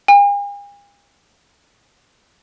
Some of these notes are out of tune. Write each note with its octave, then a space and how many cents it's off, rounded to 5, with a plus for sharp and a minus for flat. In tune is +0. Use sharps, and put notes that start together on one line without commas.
G#5 -45